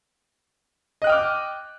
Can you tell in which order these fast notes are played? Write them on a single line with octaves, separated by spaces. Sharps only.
D#5 F#6 G5 F6 D6